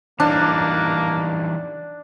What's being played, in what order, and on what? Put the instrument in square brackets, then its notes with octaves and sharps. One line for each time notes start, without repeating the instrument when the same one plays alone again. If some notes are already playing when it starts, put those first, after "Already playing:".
[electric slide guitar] E3 G3 D#4 [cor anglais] A#3 [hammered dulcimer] D4